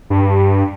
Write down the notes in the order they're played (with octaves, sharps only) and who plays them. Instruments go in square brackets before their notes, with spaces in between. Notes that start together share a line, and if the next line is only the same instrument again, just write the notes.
[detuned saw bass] G2